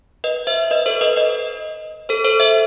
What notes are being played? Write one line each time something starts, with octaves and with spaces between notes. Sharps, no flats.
B4 D#5
C5 E5
B4 D#5
A4 C5
B4 D#5
B4 D#5
A4 C5
A4 C5
C5 E5